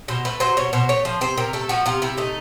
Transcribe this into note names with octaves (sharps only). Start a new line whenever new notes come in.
B2 C5
A3 B4
F#3 C5
B2 C#5
B2 C5
A3 C#5
F3 C5
C3 C5
C3 A#4
A3 A4
F3 F#4
C3 F4
C3 E4
A3 D#4